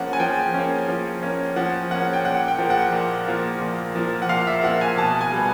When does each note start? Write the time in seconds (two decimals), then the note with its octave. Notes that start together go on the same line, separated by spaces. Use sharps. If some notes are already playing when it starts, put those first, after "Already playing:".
Already playing: F3 A#3 C#4 F#5
0.13 G#5
0.20 F3 G5
0.54 A#3 C#4
0.88 F3
1.23 A#3 C#4
1.56 F3 F#5
1.91 A#3 C#4 F#5
2.13 G5
2.25 A#2 F#5
2.48 G5
2.59 F3 A#3
2.70 F#5
2.93 A#2
3.28 F3 A#3
3.61 A#2
3.96 F3 A#3
4.22 F#5
4.29 A#2 F5
4.47 E5
4.64 F3 A#3 F#5
4.81 G#5
4.97 B2 A5
5.21 G#5
5.32 G3 B3